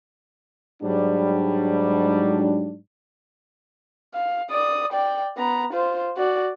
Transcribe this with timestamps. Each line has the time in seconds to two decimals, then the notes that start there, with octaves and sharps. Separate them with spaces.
0.83 G#2 F#3 G3 D4
4.14 F5
4.51 D5 D#6
4.93 D5 G5
5.37 B3 A#5
5.73 F4 C5
6.17 F#4 D5